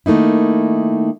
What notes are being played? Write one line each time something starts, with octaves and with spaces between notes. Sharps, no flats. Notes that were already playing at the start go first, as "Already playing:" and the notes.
D#3 A3 A#3 D#4 E4